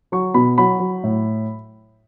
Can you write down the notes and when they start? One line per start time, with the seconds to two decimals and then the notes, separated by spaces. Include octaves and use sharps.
0.12 F#3 C#6
0.34 B2 B5
0.58 F#3 B5
0.80 F#3
1.04 A2